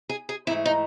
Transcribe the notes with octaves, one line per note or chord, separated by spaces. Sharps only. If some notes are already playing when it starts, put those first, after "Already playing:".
G#4
G#4
G#2 E3 A3 E4
D#4